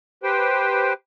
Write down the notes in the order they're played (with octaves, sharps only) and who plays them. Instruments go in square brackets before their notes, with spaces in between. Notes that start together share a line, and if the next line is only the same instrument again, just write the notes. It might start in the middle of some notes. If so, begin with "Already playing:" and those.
[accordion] G4 B4 C5 G5